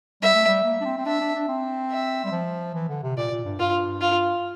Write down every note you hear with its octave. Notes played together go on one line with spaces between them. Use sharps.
G3 E5
A3
G3
A#3
D4
C4
C4
D4 E5
D4
D4
C4
E5
G3
F3
E3
D3
C3
A#2 D5
A#2
G2
G2 F4
F4